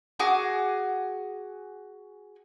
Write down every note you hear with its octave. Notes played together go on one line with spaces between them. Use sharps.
F#4 G#4 D6